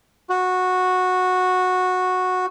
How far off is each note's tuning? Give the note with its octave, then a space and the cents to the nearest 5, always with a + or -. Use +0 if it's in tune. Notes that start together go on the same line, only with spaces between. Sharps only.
F#4 -10